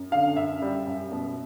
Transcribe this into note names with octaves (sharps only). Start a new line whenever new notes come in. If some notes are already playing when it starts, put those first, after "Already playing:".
Already playing: F#2
D3 F5
F#2 E5
G3
F#2
B2